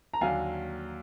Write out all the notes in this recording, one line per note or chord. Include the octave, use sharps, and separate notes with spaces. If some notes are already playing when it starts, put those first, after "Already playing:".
A#5
D#2 D3 F#3 F5 G#5